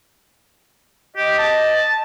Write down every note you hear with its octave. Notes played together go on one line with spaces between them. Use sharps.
G4 D#5
A5